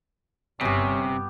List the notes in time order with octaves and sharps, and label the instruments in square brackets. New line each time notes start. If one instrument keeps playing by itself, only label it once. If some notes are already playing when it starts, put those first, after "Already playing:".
[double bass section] G1 G2 [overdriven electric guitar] C3 [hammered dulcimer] B3 G4 [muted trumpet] C#4